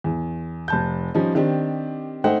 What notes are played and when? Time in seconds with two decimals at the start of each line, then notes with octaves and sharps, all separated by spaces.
0.04 E2
0.68 F1 A5 G6
1.14 F3 G3 C#4 D#4
1.35 D#3 C4 D4 G4
2.24 A3 D#4 C5 F#5 G5